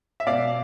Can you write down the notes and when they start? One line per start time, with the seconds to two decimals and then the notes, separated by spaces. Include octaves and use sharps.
0.20 E5
0.27 B2 D5 F5